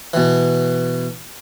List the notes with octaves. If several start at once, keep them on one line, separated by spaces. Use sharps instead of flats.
B2 E3